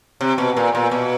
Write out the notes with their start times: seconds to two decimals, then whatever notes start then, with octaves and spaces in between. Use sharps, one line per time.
0.21 C3
0.38 B2
0.57 A#2
0.75 A#2
0.91 B2